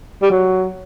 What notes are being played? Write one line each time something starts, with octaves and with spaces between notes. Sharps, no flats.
G3
F#3